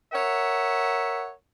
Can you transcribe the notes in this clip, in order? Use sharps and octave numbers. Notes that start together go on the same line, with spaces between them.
A#4 C#5 E5 F#5